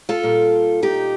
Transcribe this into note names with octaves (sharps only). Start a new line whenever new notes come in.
F4 A4
A#2 G3
D#4 G4